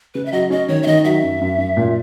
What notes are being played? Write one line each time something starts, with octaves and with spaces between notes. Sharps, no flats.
C#3 B4
E5
F#3 D#5
C#4 D#5
D#3 C#5
E5
D#3 D#5
F#3 E5
F#2
F#2
F#2
A#2